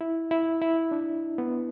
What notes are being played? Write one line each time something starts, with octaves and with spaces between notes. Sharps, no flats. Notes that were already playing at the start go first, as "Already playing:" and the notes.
E4
E4
E4
D4
B3